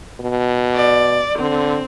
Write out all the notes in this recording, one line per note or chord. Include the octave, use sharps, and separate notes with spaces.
B2
D5
D3 C4